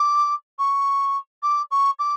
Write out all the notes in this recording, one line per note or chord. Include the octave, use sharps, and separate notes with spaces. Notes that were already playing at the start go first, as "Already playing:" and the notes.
Already playing: D6
C#6
D6
C#6
D6